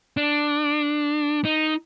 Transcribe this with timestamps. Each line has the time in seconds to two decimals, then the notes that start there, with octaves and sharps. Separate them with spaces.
0.17 D4
1.45 D#4